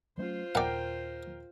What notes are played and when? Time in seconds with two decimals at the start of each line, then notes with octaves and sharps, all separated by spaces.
0.18 F#3 A3 C#4 F4 C5
0.55 D#2 A#2 A#4 D5 F#5 G5